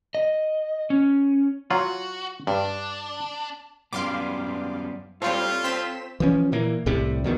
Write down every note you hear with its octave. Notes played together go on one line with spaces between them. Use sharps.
D#5
C#4
F#3 F4 F#4
G2 D4
F#2 G3 B3 F5 C6 D6
G3 C4 F4 A4 C#5
C4 B6 E7
E3 F3 C#4
A#2 E3 A#3
C2 A2 C3 G3
E2 B2 D#3